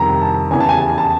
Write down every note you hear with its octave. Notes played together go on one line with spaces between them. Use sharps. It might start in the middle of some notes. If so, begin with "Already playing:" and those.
Already playing: F2 C3 D#3 G3 C4 A#5
A5
E2 C#3 E3 G#5
A5
G#5
A5
G#5
A5